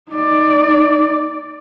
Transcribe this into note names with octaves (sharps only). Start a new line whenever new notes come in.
D#4 D5